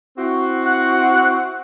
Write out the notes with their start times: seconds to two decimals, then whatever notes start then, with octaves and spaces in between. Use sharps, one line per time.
0.18 C4 E4 F#4
0.66 F#5